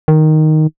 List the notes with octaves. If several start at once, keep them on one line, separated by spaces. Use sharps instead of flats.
D#3